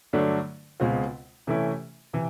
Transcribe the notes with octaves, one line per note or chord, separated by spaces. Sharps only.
G2 D3 F#3 A3 D4
C#2 B2 G#3 C4 F4
C3 E3 A3 C#4 E4
C3 E3